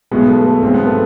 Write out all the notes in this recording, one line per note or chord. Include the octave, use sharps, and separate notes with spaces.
B1 B2 G#3 B3
A3
A3
B1 B2 G#3 C4
B3
A3